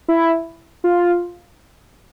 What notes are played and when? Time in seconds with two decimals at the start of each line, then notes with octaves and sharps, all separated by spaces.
0.08 E4
0.84 F4